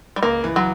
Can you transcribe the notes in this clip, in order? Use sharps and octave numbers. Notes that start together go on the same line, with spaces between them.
G3
C#2 A#3
E3
F#3